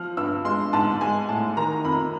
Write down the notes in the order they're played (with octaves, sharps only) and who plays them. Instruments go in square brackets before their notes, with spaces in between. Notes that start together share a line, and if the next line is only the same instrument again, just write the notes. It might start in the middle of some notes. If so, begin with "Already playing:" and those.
Already playing: [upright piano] F3 F6
G2 E6
G#3 C6
G#2 A5
G#3 G#5
A2 A5
D#3 A#5
F2 B5